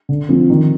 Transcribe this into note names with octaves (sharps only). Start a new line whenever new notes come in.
D3
F3 C4
D#3